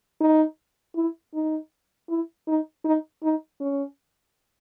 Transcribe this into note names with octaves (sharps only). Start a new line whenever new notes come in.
D#4
E4
D#4
E4
D#4
D#4
D#4
C#4